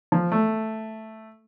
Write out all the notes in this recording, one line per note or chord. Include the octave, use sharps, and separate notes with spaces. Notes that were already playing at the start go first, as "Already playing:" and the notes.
F3
A3